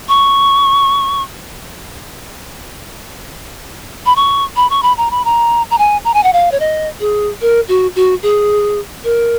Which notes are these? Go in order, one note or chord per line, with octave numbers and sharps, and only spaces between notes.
C#6
B5
C#6
B5
C#6
B5
A#5
B5
A#5
A#5
G#5
A#5
G#5
F#5
F5
C#5
D#5
G#4
A#4
F#4
F#4
G#4
A#4